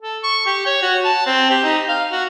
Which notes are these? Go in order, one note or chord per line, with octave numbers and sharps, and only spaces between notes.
A4
C#6
G4
C#5
F#4
A5
C4
G4
D#4
F5
F#4